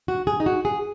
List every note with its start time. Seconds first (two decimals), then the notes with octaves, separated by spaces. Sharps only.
0.08 F#4
0.27 G#4
0.40 D#4
0.46 F#4
0.65 G#4